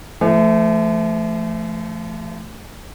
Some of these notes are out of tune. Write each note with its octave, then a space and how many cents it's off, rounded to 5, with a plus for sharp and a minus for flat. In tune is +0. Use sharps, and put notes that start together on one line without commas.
F3 -40 A3 +0